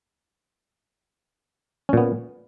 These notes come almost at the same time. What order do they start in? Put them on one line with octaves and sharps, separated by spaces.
C#4 A#2 B3